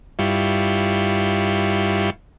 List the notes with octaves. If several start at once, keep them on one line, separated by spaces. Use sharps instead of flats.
G2 G3 E4 F4 C#6